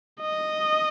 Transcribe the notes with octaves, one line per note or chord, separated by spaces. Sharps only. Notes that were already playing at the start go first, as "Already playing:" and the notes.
D#5